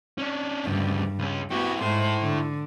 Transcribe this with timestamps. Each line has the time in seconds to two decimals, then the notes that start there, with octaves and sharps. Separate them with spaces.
0.18 C#4 D4
0.66 D2 G2 C#3
1.19 C#2 C#4
1.51 B3 E4 F#4 G4
1.82 G#2 E4 A4 C5
2.21 D3